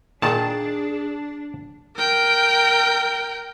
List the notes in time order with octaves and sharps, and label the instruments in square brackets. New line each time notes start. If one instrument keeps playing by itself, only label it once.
[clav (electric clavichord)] A#2 D#3 [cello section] D4 [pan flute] G#4 [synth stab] A5
[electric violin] A#4 G5